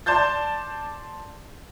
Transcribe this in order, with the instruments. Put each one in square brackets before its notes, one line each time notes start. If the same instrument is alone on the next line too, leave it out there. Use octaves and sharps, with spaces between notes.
[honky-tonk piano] D5 A5 C6 G6 A6